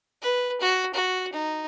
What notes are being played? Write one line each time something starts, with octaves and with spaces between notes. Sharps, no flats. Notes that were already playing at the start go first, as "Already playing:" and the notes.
B4
F#4
F#4
D#4